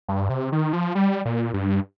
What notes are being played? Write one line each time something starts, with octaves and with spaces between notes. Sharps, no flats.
G2
C3
D#3
F3
G3
A#2
G2